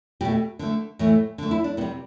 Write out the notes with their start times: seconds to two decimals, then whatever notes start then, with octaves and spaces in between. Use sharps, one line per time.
0.21 B2 G4
0.25 A3
0.59 D3 A3
0.99 A2 E3 A3
1.38 D3 A3
1.51 E4
1.64 D4
1.77 C3 B3
1.81 G3